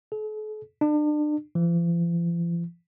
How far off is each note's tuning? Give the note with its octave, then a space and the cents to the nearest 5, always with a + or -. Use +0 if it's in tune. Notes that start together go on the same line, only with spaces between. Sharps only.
A4 -45
D4 +35
F3 -45